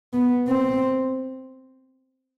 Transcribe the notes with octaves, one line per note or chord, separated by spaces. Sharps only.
B3
C4